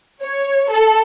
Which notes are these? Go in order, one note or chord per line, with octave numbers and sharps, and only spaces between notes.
C#5
A4